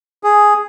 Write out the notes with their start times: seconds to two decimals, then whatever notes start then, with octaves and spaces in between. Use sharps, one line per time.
0.24 G#4